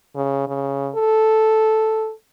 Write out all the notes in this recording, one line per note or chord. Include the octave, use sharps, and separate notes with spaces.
C#3
C#3
A4